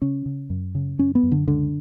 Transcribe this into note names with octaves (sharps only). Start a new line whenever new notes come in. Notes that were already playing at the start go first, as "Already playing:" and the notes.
C#3 C#4
C#3
F#2
C#3
F#2 C#4
B3
F#2
D3
C#2 D3